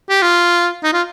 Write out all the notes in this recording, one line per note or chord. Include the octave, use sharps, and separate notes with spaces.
G4
F4
D#4
F4